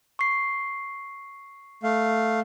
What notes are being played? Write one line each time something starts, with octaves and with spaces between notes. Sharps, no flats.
C#6 C7
A3 F5